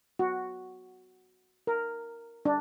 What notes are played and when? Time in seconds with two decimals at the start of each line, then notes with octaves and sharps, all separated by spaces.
0.19 F#4
1.67 A#4
2.45 D4